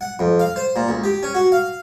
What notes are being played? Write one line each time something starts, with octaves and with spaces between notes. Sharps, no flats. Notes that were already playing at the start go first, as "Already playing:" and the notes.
F#5
F2
F5
C5
A#2
C#2
G4
C#4
F#4
F5